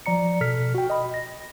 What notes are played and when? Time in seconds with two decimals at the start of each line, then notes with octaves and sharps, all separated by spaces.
0.06 F3 D5 A#5 C#7
0.41 B2 A4 F6 B6
0.75 F#4 G5
0.90 D#5 B5
1.14 A#6